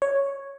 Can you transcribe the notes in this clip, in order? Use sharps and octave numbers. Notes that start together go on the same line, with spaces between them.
C#5